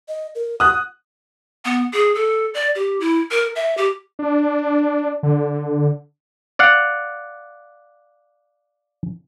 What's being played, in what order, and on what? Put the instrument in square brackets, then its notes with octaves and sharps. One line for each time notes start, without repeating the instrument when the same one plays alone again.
[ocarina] D#5
A#4
[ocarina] F#5 [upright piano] D#6 F#6
[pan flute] B3
G#4
A4
D5
G4
E4
A#4
E5
G4
[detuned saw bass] D4
D3
[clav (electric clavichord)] D5 F5 F#5